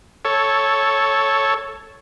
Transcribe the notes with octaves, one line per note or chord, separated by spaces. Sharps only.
A4 C#5